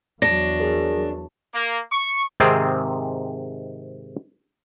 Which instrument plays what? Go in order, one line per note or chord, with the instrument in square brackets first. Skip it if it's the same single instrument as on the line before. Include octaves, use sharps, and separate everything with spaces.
[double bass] E2 F#3 [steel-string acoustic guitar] D4 [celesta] A#6
[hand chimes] G#4 A#4
[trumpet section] A#3
C#6
[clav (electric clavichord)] G#2 C3 D#3 C4 G#4 G5